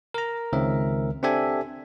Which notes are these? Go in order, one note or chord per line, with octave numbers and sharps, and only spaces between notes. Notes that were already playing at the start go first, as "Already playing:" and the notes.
A#4 A#5
C#2 D#3 C4 A#4 E5
C4 D4 G4 A4 E5 G#5